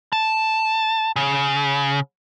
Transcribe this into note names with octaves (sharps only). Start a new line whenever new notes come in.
A5
C#3